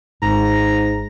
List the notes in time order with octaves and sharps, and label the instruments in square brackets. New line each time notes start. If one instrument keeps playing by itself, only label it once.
[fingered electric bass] G#1 [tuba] G#2 [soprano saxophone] A#5